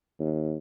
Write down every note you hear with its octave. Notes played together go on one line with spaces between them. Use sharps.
D#2